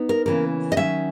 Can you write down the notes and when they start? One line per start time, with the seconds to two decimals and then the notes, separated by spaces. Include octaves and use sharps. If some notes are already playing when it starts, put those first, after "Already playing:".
Already playing: B3 D#4
0.09 A#4
0.26 C#3 E3 A#3 C#4 A#4
0.72 D#5
0.76 D#3 F#3 C#4 E5